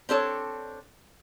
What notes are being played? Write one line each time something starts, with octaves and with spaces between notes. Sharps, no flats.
C4 D4 A4 C#5